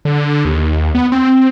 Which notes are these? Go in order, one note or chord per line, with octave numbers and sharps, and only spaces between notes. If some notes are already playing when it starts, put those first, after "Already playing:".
D3
D#2
B3
C4